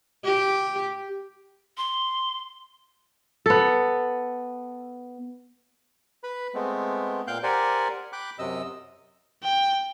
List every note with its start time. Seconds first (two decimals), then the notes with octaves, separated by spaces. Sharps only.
0.24 G4
1.78 C6
3.46 B3 A4
6.24 B4 B5
6.54 G#3 A3 B3 C4
7.27 A#2 F5 G5 F#6 G6
7.43 G4 A#4 C5 D5 F#5 G#5
8.13 G5 B5 D6 F#6
8.39 F#2 C3 D#5 E6
9.43 G5